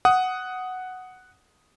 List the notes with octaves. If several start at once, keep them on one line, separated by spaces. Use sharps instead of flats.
F#5 D#6